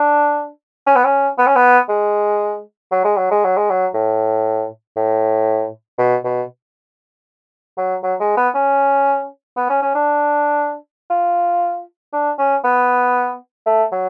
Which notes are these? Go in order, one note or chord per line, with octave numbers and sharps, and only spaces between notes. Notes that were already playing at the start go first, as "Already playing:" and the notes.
Already playing: D4
C#4
B3
C#4
B3
C#4
B3
G#3
F#3
G#3
F#3
G#3
F#3
G#3
F#3
A2
A2
B2
B2
F#3
F#3
G#3
B3
C#4
B3
C#4
C#4
D4
F4
D4
C#4
B3
A3
F#3